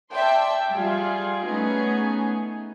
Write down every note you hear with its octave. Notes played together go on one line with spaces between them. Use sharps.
D5 E5 G5 A5 C6
G3 F4 G#4
A3 B3 C#4 D#4 G#4